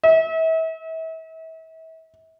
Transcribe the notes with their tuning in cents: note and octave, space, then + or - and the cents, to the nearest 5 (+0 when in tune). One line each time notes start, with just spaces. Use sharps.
E5 -35